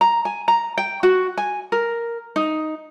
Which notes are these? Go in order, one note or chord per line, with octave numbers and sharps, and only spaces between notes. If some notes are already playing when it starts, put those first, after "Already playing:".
A#5
G#5
A#5
G5
F#4
G#5
A#4
D#4